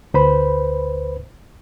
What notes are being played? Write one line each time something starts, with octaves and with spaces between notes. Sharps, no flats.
D2 B4 C5 B5